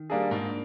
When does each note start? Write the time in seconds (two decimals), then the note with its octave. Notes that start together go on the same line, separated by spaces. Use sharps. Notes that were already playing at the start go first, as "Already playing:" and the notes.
Already playing: D#3
0.10 G3 A#3 D4 G#4
0.31 G#2 A#3 D4